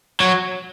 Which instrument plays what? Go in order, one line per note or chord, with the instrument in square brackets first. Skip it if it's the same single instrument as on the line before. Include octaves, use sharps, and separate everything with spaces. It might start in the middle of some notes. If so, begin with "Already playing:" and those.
[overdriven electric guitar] F#3